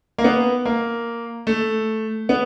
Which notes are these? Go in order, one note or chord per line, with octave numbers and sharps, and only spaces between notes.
A#3
B3
A#3
A3
B3